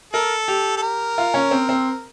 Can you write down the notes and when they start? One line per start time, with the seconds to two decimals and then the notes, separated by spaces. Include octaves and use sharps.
0.13 A4 A#4
0.48 G4
0.77 A4
0.82 A#4
1.18 F4
1.34 C#4
1.51 C4
1.69 C4